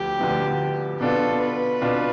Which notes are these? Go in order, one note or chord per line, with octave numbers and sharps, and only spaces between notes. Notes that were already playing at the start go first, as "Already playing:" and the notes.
Already playing: D2 D3 F3 B3 G4
D2 D3 F3 B3
B2 B3 D4 F4 A4
B4
B2 B3 D4 F4